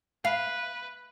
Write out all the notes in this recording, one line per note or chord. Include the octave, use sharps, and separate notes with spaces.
B4 F5